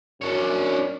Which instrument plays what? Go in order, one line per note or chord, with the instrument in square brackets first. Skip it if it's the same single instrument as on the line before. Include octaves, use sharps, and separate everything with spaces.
[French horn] F#2 [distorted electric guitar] D4 C#5